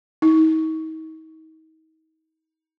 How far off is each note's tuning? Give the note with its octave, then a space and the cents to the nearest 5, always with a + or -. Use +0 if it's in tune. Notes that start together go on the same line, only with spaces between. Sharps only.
D#4 +35